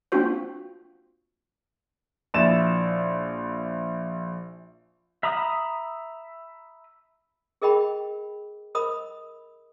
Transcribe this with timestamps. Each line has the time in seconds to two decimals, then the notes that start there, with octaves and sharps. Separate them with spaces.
0.12 A#3 C4 D4 F4 F#4 C5
2.34 A#1 E4 A6 E7
5.23 E5 A#5 B5 D#6
7.62 G#4 A#4 D#5 G5 B5
8.75 A#4 D#5 B5 D#6